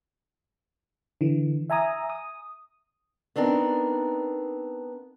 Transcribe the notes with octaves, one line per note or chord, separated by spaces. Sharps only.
D3 E3
E5 G#5 A#5 D#6
D#6
B3 C4 D4 D#4 A#4